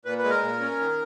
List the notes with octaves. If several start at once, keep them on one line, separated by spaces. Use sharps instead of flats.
A#2 B4
B4
G#3
A#4
A#2
C#4
D#3